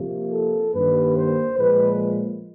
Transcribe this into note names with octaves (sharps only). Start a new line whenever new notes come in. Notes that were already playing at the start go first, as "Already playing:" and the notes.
Already playing: C3 F3 A#3
A4
G2 D#3 G3 A#3 B4
C5
A#2 F3 G#3 B4